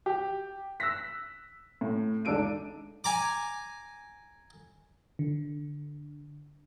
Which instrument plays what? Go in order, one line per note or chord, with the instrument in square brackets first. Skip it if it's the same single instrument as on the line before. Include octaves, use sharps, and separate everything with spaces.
[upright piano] G4
E6 F#6 A#6 B6
A2
C#2 D4 D#4 A4 D7 D#7
[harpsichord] G#5 A#5 D6
[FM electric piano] D3